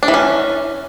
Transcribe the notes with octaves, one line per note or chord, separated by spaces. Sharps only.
D4
E3
C#4